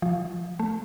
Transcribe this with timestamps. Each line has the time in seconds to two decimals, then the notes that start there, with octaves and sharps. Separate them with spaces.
0.02 F3
0.59 A3